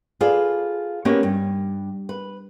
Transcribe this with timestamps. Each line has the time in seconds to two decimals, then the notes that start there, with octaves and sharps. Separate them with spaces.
0.21 F4 G#4 A4 B4 D5 F5
1.05 A#3 B3 C#4 D#4 F#4 G4
1.23 G2
2.09 B4